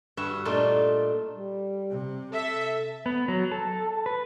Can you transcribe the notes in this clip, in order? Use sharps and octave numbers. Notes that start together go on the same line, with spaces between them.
G2 F#4 B4 E5
A#2 A3 D4 D#4 F4
G3
C3
A4 E5
B3
F#3
A4
B4